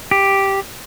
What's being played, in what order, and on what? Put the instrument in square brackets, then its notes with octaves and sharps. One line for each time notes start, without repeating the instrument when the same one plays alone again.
[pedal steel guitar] G4